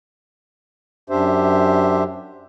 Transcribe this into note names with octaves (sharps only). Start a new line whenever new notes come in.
F#2 D4 G4 C5 E5